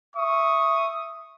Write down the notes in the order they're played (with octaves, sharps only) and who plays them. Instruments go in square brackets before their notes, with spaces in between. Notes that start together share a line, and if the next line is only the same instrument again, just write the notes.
[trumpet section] E5 C#6 D#6